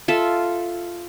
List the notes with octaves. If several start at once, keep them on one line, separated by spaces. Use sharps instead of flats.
F4 A4 E5